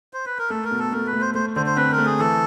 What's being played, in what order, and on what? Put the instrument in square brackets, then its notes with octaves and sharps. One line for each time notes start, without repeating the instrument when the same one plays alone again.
[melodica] C5
B4
A#4
[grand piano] A3 [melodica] A4
[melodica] A#4
[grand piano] B2
[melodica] A4
[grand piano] A3 [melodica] A#4
[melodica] B4
[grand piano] A3
[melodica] C5
[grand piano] A3 [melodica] C5
[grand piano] D3 [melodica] C5
[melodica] C5
[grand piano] C4 [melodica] B4
[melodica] A#4
[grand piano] A3
[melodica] G#4
[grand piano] E3 [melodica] A4